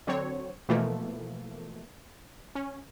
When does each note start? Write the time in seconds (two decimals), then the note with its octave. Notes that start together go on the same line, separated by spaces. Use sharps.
0.07 D3 F#3 C4 C#5
0.69 B2 E3 F3 A3 A#3
2.55 C#4